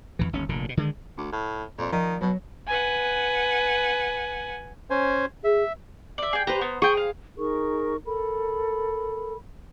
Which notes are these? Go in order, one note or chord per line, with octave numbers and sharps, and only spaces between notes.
F2 G#2 E3
G1 D#2 C#4
F1 A#2 D3
G#2 B2
D3 D#3 G#3
D2
A2
F2 A#2
D#3 F3 D5 D#5
B2 F#3
B4 F#5 G#5
C#4 C5 G#5
G#4 E5
D5 E5
G#4 G5
G4 B4 C5 A#5
B3
G#4 G5 C#6
F5
D#4 G#4 A#4 C#6
A4 A#4 B5